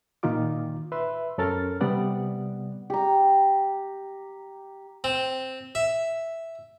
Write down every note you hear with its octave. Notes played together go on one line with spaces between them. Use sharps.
A#2 D#3 D#4 F4 D6
B4 E5 C6 E6
F#2 C#4 A4 A#4 F6 A6
C3 G3 B3 D5 F#5
G4 A#5
C4
E5